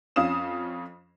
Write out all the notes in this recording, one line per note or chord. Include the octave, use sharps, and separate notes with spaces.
F2 C#4 F5 D#6 E7